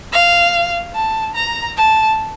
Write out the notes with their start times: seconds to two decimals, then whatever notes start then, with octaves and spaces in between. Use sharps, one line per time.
0.12 F5
0.95 A5
1.35 A#5
1.77 A5